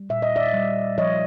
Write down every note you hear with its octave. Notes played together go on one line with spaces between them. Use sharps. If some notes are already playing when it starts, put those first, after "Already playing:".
Already playing: G3
A#2 E5
D#5
D5 E5
G3
F3 C#5 D#5